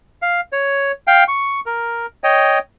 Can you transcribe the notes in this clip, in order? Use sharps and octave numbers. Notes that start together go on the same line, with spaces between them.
F5
C#5
F5 G5
C#6
A#4
C#5 D#5 G5